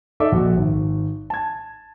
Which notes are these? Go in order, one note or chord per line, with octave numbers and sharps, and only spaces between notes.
D#4 A4 D5 E5 D6
A#1 F#4
G#1
A5 G#6